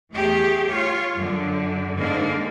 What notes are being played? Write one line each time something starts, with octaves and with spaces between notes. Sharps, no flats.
E2 A3 G4 G#4
F4 C#5
F#2 D3
G#2 D3 G#3 A#3